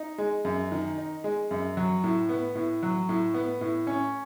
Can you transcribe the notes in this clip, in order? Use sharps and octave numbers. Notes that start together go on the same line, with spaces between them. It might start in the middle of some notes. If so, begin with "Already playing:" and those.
Already playing: D#4
G#3
F#2
D#3
D#4
G#3
F#2
F#3
A2
B3
A2
F#3
A2
B3
A2
C#4